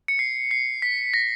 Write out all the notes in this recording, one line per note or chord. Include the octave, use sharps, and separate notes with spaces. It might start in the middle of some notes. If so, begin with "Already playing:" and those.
C#7
C7
C7
B6
A#6